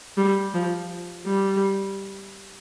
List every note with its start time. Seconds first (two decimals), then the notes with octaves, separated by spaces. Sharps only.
0.17 G3
0.54 F3
1.26 G3